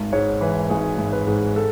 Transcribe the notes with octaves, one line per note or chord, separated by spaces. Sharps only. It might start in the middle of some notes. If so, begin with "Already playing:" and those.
Already playing: G#1
G#2 C#5
E3 B4
G#1 G#4
G#1
B4
G#2
A4